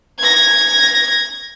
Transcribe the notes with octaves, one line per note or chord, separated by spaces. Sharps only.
G#6 A#6